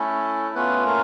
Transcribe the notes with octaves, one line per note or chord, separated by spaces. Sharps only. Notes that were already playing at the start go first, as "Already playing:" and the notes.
Already playing: A3 C#4 E4 A4
A3 B3 C#4 F4 B4
A#3 A#4